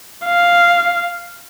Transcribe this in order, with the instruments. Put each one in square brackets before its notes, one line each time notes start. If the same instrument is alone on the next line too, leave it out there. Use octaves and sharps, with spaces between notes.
[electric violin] F5